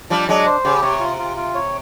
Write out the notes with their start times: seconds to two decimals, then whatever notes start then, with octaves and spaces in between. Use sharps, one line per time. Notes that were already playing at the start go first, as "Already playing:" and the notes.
0.10 F3 G3 D4
0.28 F#3 G#3 D4
0.46 C5
0.65 C#3 G4
0.82 C3 C#5
1.00 F4
1.19 F4
1.36 F4
1.55 C#5